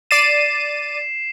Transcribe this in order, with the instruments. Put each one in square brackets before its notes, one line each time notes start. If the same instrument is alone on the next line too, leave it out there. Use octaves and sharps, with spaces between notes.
[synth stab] D5 A6 D#7 [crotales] C7 E7